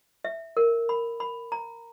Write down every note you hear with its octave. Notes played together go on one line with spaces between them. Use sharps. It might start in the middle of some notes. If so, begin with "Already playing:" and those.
E5
A#4
B5
B5
A#5